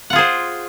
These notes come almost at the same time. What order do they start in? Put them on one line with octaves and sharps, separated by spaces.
F#5 F4 G#4 C5